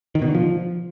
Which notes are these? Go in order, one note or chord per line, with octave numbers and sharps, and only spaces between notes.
D#3
B2
D3
F3